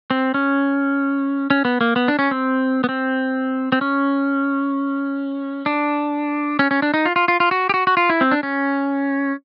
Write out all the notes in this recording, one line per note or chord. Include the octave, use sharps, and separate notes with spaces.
C4
C#4
C#4
B3
A#3
B3
D4
C#4
C4
B3
C4
C4
C#4
D4
C#4
C#4
D4
D#4
F4
F4
F4
F4
F#4
G4
F#4
F#4
F4
E4
C4
D4
C#4